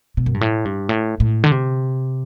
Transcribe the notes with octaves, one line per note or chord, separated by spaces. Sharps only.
B2
F#2
G2
A2
G2
A2
A2
D3
C3